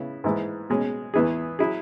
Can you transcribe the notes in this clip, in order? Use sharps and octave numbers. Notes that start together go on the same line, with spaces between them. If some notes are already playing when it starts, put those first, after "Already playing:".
Already playing: C#3 B3 E4
G#2 E3 G#3 E4
B2 G#3 C#4
E2 E3 B3 E4 G#4
F#3 E4 G#4